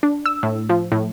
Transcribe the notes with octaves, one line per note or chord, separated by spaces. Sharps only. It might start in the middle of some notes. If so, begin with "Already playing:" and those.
D4
E6
A2
F3
A2